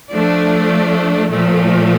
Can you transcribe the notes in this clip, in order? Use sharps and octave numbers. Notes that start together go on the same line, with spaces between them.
F3 A3 D4
A#2 F3 A3